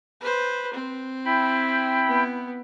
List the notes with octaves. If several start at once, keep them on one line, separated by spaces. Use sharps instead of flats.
B4 C5
C4
E4 G5 B5
B3